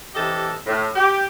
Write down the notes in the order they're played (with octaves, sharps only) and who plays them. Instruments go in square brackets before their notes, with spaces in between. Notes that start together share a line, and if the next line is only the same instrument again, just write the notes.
[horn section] C3 E3 G4 A4 D#5 A5
A2
G4